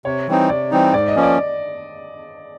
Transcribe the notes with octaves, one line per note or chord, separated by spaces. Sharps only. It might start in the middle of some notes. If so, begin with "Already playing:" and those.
C3 C#5
E3 G3 C4 D#4
C3 D5
E3 G3 C4 D#4
G#2 D5
D#5
F3 A#3 C#4
D5